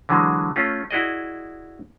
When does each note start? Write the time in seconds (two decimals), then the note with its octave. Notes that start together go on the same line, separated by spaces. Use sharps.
0.09 D3 E3 F#3 G#3
0.56 A3 C#4 F4
0.91 E4 F#4 G#4 D5 D#5